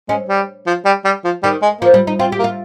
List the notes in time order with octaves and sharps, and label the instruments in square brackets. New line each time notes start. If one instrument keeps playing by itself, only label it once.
[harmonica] G#3 [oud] C#4
[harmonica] G3
F3
G3
G3
F3
[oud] D#3 [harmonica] G3
[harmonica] G#3
[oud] F3 [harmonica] A#3
[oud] G3
D#4
[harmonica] C4 [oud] F4
[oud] G4
[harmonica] A#3
[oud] F4